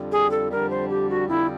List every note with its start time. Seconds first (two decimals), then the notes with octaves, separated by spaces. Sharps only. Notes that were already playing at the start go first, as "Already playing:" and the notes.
Already playing: F2 D3 G3
0.12 G#4
0.31 A4
0.51 F2 D3 G3 A#4
0.70 C5
0.89 G4
1.10 F#4
1.29 F2 D3 G3 E4